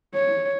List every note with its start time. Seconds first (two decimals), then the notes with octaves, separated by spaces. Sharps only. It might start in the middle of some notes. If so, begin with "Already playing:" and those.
0.15 C#5